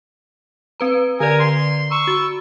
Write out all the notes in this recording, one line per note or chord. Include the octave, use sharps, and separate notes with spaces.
C4 B4 A#5
D3 A#4 D5 G#5
C6
A#5 C#6 E6
F#4